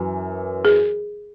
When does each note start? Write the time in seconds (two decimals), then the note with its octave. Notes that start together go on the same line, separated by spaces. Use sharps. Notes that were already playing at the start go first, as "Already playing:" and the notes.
Already playing: F#2 E3
0.65 G#4